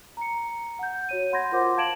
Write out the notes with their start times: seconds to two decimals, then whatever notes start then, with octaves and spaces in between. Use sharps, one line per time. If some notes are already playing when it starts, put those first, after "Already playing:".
0.17 A#5 C#7
0.79 F#5 G6
1.09 F#4 C#5 D#7
1.32 F#5 B5 C6 G6 G#6 A#6
1.52 F4 A#4 C5 F#5 D6
1.77 F5 A5 G#6 D7 E7 F#7